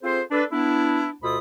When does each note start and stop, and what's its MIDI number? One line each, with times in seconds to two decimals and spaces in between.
0.03 0.21 60
0.03 0.21 65
0.03 0.21 68
0.03 0.21 69
0.03 0.21 72
0.31 0.43 62
0.31 0.43 69
0.31 0.43 71
0.51 1.10 59
0.51 1.10 62
0.51 1.10 64
1.23 1.38 38
1.23 1.38 47
1.23 1.38 65
1.23 1.38 69
1.23 1.38 83
1.23 1.38 87